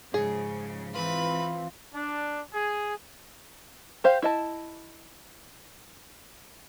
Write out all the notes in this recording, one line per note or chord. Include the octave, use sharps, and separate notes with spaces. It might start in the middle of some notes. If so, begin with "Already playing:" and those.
G#2 C#3 F3 G#4
E3 C4 F4 B4 B5
D4
G#4
G4 C5 F5
E4 D#5 A5